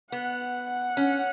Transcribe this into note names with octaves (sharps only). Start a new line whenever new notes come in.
B3 F#5
C#4